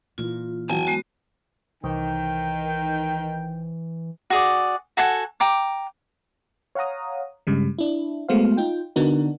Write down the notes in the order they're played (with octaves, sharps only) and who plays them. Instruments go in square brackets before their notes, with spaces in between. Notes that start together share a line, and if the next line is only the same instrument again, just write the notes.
[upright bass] A#2 E3 [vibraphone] F4
[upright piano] E2 F#3 [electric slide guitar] G#5 A5
[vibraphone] G#3 B3 F#4
[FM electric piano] C2 [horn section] D#3 G5 [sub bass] E3
[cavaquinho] F#4 G#4 D5
F#4 A4 F#5 G#5
G5 A#5 D6
[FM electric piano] C#5 F5 F#5 A#5 D#6
G2 C#3 G3 G#3
D4 E4
G#3 A3 B3 F#4 C5 F5
D#4 F4 G5
D3 B3 D4 D#4 F#4 A#4